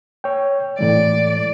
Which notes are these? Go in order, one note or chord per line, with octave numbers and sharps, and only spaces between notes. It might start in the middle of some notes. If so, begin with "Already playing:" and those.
C#5 G5
A2 E3 G#3 D5